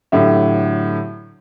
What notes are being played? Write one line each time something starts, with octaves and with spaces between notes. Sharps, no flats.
A2 D3 F#3 G4 E5